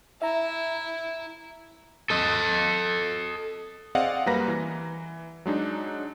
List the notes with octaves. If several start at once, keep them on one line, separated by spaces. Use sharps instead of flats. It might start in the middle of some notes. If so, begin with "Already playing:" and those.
E4 E5 A#5
A4 D#5
C4 G#4 D5 D#5 F5 F#5
F#2 G3 A#3 B4 A#5 A#6
E3
F#3 G#3 D4 D#4